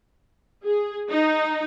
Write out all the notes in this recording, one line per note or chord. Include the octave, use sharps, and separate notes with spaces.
G#4
D#4